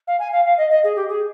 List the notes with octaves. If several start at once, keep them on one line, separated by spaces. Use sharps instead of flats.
F5
G#5
F5
F5
D#5
D#5
G#4
G4
G#4